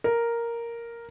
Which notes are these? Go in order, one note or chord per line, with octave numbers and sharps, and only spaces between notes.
A#4